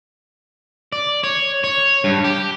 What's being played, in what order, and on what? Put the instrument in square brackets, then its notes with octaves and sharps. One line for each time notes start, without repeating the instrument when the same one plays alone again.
[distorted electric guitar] D5
C#5
C#5
G2
G4